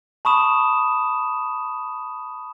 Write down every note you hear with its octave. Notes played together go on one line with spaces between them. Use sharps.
A5 B5 C#6 D#6 E7